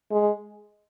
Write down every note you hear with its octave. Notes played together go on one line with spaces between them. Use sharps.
G#3